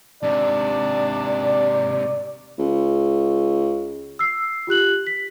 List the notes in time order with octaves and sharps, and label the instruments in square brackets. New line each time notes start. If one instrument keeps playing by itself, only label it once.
[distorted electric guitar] G#2 C3 [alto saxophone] D4 [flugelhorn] D5
[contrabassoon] C#2
[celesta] E6 C7
F4 G4 F#6 F#7
B6